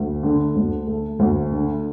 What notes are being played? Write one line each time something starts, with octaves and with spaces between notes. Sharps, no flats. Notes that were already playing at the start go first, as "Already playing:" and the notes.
Already playing: D2
D3
D2
A3
D2
D3